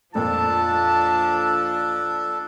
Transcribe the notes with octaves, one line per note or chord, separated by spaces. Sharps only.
F2 A#2 F3 D4 A4 A5